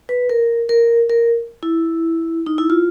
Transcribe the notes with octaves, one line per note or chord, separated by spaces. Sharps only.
B4
A#4
A#4
A#4
E4
D#4
E4
F4